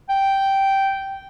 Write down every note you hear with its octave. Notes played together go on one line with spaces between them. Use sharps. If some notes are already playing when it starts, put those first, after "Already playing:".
G5